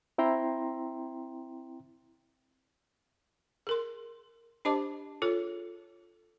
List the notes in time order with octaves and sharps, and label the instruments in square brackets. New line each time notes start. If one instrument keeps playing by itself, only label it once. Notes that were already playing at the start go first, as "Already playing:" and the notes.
[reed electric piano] C4 E4 G5 A#5 C6
[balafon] G#4 A#4 C6
D4 G4 C5 D#5 A5 D6
F4 G#4 A4 C#5